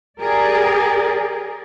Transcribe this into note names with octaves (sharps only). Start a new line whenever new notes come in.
G4 G#4 A#4 D5